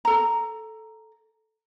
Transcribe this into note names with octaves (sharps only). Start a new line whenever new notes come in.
A4 A#5